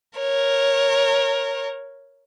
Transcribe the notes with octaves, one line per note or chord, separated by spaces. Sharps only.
A#4 C#5